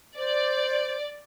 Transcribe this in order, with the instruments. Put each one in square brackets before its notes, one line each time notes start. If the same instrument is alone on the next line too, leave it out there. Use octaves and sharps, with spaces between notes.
[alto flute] C5 [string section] D5